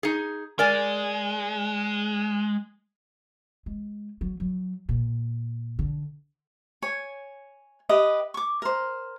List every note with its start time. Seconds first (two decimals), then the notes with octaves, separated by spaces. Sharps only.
0.03 D#4 G#4
0.59 G#3 A#4 D5 G#5
3.66 G#3
4.21 F#3
4.40 F#3
4.89 A#2
5.79 D3
6.82 C#5 G#5
7.89 G4 B4 D#5
8.34 C#6 D6
8.62 A#4 C5